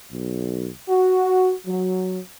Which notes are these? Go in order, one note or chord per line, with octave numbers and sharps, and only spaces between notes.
B1
F#4
F#3